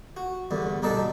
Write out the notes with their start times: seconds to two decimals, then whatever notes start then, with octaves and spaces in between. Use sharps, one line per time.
0.17 F#4
0.51 E2 G2 D3
0.82 G2 B2 D4 D#4 A4 A5